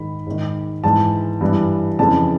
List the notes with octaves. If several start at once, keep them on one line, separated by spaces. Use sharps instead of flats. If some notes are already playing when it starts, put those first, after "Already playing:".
Already playing: G#2 D#3 B5
G#2 D#3
G#2 E3 A5
G2 E3
F2 C#3 E3 A5